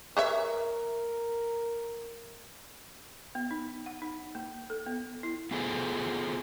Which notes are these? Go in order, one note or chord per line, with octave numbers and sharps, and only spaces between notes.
A#4 B4 C#5 E5
B3
D#4
F#5
D#4
A#3
A4
B3
E4
B3 F4 G#4 A4 C5